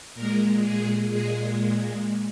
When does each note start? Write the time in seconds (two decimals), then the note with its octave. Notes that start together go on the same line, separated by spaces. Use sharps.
0.15 A#2 G#3 A#4
0.64 G#4
1.13 A#2 G#3 G#4